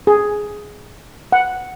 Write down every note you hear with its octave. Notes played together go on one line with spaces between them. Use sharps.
G#4
F#5